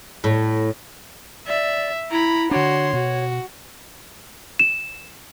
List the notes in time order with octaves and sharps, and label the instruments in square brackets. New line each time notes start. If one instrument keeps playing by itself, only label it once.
[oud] A2
[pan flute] D5 [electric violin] E5
[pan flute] E4 [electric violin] A#5 B5
[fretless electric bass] D3 D4 [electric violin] F#4 C6 [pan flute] C#5
[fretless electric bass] B2 [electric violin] F#4
[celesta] E7